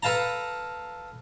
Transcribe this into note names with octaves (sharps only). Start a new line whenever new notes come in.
A4 B4 F5 A5 A#5